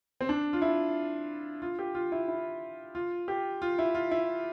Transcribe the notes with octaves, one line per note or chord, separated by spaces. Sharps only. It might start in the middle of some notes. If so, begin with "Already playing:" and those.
C4
D4
F4
E4
F4
G4
F4
E4
E4
F4
G4
F4
E4
F4
E4